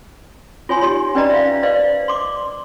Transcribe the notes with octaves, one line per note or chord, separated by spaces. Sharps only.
F4 C#5 G#5 C6
D#4 G4 C#5 C6
C#4 B4 D5 D#5 A#5 B5
E5 F5
B4 C5 D5 D#5 F5
C6 D6